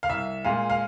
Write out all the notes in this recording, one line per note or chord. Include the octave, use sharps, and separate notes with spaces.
F5
C2 E5
A#2 G#3 F5
F5